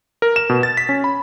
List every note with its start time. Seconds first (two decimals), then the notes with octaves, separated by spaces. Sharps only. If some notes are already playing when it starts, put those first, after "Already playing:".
0.22 A#4
0.36 E7
0.49 B2
0.63 A6
0.77 B6
0.89 C#4
1.04 B5